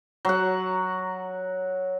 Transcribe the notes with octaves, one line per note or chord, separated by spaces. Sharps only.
F#3 F#5